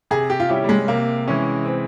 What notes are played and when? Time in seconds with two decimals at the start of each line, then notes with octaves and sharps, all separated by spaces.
0.11 C3 G#4
0.30 G4
0.40 F4
0.49 G3 C#4 E4 G4 C#5
0.64 G3
0.69 G#3
0.88 C3 A#3
1.27 E3 G#3 C#4 E4 G#4
1.65 C4